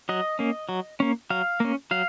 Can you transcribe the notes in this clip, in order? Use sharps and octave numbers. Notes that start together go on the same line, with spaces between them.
F#3 D#5
A#3 C#4
F#3
A#3 C#4
F#3 F5
A#3 C#4
F#3 F5